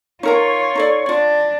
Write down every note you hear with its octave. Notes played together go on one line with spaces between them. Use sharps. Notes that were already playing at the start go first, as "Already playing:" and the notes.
D#4 F4 A#4 C#5 A#5
D#4 A4 D5
D4 F4 D5